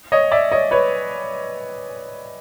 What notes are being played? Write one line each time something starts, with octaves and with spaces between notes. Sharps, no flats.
C#5 D#5
D5 E5
C#5 D#5
B4 C#5